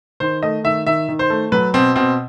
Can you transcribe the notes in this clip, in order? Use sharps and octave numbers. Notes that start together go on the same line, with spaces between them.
D#3 C5
A3 D#5
D#3 E5
D#3 E5
D#3
C5
A3
F#3 B4
B2 C4
B2 C4